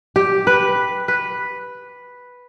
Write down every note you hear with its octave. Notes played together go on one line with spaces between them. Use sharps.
G4
B4
B4